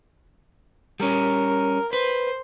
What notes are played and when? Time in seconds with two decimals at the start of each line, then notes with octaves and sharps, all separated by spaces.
1.00 G3 C#4 A#4
1.93 B4 C5